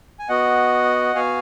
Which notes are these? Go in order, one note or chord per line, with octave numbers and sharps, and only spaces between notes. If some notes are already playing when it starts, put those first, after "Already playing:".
G#5
B3 F#4 D#5 F#5
B3 F#4 F5 G#5